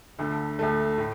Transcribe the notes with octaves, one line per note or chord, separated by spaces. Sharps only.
D2 D3 A3
D2 D3 A3
A2